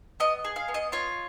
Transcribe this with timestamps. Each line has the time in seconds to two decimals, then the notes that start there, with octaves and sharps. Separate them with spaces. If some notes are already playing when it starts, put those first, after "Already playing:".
0.20 B3 D#5
0.44 G#4
0.56 F5
0.68 B3
0.74 D#5
0.92 F4 C#5